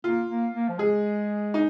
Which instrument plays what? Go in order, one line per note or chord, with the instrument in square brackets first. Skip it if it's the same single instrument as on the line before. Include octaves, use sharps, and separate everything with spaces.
[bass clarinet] A#3 [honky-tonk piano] F4
[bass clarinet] A#3
A#3
F3
[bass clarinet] G#3 [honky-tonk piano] G#4
[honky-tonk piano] D#4